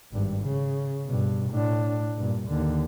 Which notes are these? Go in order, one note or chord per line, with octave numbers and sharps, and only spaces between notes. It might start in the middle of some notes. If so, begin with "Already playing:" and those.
G#1 G2
C#3
G2 B2
A2 D4
G2 A#2
D#2 D3